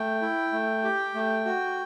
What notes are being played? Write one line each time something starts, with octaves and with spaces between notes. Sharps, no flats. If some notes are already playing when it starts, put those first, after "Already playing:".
Already playing: A3 G5
E4
A3
G4
A3
F#4